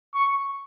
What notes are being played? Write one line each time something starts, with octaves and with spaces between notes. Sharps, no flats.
C#6